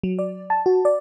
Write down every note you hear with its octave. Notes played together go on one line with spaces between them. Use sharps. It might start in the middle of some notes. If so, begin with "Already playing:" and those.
F#3
D5
A5
F#4
D5